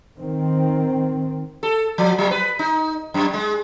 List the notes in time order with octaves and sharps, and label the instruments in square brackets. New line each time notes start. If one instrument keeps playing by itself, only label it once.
[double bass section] D#3 C4
[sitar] A4
F3
F#3
B4
D#4
F#2
G#3